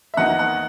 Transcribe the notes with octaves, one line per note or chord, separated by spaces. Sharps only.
E5
E2 D#3 A#3 D#4 F#5
F#5